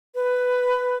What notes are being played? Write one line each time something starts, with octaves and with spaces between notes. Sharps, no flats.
B4